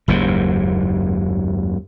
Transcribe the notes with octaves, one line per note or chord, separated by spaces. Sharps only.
F#1 D#2 G#2